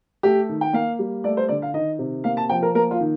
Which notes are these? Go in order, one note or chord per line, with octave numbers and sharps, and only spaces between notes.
A3 G4
D#3
G5
A#3 F5
G3
A3 D5
C5
D3 D5
F5
D#3 D#5
C3
A#3 F5
A5
F3 G5
A#4
A#3 A#4
F4
D#3